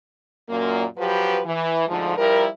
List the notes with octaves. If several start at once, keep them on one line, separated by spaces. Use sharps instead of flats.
F#2 A#2 A#3
F3 F#3 G4 B4
E3
D2 G#2 D3 F3
F3 G3 E4 A#4